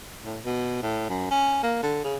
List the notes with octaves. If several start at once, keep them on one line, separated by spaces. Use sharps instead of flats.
A2
B2
A2
F#2
C#4
A#3
D3
C#3